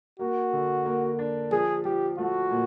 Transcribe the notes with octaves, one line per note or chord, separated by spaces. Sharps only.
A#3 F#4
D3
A#3
D4
F3 G#4
F3 G4
A3 F#4
A#2